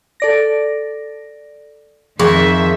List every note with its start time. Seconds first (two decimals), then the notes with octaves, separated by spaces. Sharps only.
0.20 A4 D5 A#6
2.19 F2 D#3 G#4 E5 C#6